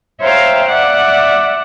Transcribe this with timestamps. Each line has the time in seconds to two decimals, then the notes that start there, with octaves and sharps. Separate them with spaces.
0.20 C5 C#5 E5 F5 G5 A#5
0.69 D5 E5 F#5